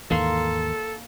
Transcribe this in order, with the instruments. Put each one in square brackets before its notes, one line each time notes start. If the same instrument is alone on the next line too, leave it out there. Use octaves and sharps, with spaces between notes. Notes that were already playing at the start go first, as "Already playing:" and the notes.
[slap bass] D#2 G#2 E3 [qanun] A#3 C6 [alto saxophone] A4